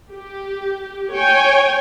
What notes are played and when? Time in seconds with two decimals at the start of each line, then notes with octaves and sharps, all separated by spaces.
0.13 G4
1.12 C#5 G5 G#5